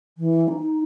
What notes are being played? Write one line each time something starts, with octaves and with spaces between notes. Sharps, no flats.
E3
D#4